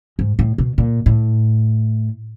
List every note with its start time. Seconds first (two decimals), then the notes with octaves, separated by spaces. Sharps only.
0.19 G#2
0.39 A2
0.58 B2
0.78 A#2
1.06 A2